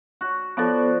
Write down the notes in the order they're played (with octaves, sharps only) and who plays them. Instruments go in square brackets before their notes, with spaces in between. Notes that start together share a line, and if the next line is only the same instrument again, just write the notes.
[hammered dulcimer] F#4
[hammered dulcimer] F3 F#4 D5 [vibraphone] B3 A4